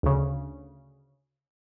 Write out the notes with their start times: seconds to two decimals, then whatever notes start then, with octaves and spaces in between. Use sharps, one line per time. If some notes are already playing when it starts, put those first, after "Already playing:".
0.03 D2 C#3